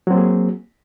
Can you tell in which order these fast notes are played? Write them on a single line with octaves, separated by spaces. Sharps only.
F#3 C4 A#3 G#4